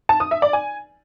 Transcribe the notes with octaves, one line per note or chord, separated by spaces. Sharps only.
A5
D#6
E5
D5
G#5